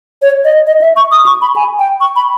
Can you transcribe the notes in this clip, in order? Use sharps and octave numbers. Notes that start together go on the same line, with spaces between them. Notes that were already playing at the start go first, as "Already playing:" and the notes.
C#5
D#5
D#5
E5
C#6
D#6
C#6
B5
G#5
G5
C#6
B5